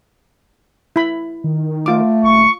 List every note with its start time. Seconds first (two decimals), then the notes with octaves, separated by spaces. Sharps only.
0.96 E4 B5
1.44 D#3
1.86 A3 F4 D6
2.23 D#1 C#6